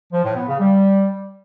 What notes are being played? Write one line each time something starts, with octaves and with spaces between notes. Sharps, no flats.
F3
A2
B3
C#3
G3